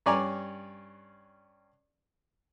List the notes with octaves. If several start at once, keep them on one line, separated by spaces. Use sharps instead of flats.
G2 C#4 C#5 D5 G#5 A#5